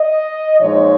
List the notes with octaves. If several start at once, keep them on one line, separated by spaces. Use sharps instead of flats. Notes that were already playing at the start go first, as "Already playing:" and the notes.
Already playing: D#5
A#2 F3 G#3 D#4 C#5